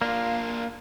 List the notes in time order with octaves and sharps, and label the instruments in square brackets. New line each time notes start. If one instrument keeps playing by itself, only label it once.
[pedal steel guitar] A#3 [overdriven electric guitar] D4 F4